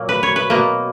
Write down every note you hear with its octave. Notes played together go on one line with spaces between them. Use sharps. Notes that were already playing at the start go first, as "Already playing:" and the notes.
Already playing: A#2 F#3 A#3
B4
C#5
B4
B2 A#3